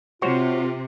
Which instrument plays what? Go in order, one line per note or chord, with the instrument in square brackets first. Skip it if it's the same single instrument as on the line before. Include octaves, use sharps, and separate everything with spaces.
[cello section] C3 [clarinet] F4 [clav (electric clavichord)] F#4 C5 C#5